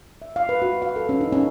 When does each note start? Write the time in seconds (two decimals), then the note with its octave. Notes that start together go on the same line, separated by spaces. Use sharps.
0.22 E5
0.36 F5
0.49 B4
0.62 F#4
0.82 F5
0.96 A4
1.09 C#4
1.21 D#4
1.32 C#4